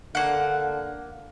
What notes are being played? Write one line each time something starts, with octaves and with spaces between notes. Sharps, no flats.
D3 A#3 F#5